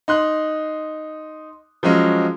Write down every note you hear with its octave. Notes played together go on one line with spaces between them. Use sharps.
D#4 C6 F#6
F3 F#3 G#3 C#4